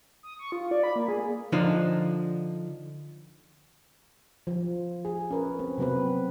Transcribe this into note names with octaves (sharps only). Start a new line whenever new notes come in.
D#6
C#6
F4
D5
B5
A#3
G#4
D3 F3 D4 D#4
F3
G#4
C#4 A#4 B4
C4
C3 F#3 B3 C4 B4